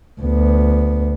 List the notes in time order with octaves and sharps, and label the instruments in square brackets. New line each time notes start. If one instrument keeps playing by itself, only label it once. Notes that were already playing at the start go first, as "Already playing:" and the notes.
[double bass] D2 B3